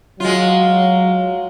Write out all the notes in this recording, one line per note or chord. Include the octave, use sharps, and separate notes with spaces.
F#3 G#3 F4